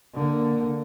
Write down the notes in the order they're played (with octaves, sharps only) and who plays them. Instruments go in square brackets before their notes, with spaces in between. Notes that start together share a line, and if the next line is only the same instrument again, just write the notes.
[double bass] D3 A#3